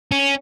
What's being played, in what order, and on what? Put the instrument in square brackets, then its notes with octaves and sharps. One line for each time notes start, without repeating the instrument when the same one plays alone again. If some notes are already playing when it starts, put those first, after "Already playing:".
[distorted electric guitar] C#4